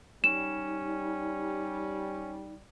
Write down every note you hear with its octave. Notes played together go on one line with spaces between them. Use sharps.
G3 C#4 D#4 E7